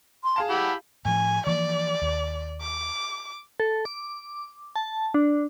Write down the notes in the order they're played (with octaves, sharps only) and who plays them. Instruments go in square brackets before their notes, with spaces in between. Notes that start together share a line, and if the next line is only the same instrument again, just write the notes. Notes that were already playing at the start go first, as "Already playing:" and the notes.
[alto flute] C6
[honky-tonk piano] G#4 F5 A5
[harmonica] E4 G4 B5 [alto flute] F#5
[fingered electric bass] A2 F3 [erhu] G#5
[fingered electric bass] E3 F3 A#3 [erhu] D5
[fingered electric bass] D#2
[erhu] D6
[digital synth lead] A4
D6
A5
D4